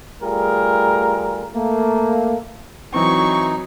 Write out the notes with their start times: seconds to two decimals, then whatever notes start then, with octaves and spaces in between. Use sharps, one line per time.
0.21 G3 A3 F4 G#4 A#4
1.54 A3 A#3
2.94 E3 F#3 C4 D#4 C#6